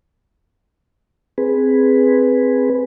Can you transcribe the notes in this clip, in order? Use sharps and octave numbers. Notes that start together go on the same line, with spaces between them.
C4 G#4 B4